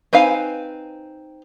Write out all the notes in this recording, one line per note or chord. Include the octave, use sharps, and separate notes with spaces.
C4 D#4 B4 F5 G#5